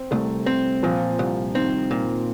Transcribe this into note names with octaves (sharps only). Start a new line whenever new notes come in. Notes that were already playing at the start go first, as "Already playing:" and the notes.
Already playing: C4
C2 A3
C4
A#2 F3
C2
D#3 C4
A#2